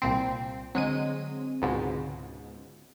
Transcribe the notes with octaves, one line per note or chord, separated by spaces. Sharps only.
C2 A#2 C4
D3 F#3 G#3 C4 D#7
C#2 G#2 B2